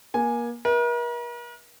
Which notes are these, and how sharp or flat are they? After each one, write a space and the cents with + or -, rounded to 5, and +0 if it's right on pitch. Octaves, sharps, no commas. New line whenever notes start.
A#3 +30 G#5 +0
A#4 +45 E5 -35